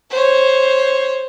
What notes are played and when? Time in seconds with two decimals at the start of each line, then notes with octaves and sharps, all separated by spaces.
0.10 C5 C#5